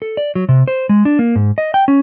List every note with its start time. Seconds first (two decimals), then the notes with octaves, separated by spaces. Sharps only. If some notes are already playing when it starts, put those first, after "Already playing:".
0.02 A4
0.17 D5
0.35 F#3
0.49 C3
0.68 C5
0.89 G#3
1.05 D4
1.19 A#3
1.35 G#2
1.58 D#5
1.74 G5
1.88 C#4